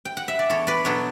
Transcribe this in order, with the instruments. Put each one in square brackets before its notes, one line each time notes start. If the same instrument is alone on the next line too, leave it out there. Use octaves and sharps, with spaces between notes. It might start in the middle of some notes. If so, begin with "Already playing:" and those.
[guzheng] G5
F#5
E5
D5
E2 A4 C#5
B4 D5
B2 F#3 B3 D4 A4 C#5